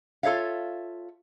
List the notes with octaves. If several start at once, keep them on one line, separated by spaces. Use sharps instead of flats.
F4 A4 C#5 E5 F5